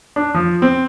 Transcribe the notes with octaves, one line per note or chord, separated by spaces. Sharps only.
D4
F3
C4